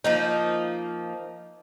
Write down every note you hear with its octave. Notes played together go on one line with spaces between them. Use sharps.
F3 A#3 D#4